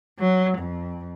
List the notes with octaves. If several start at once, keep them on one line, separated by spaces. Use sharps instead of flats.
F#3
F2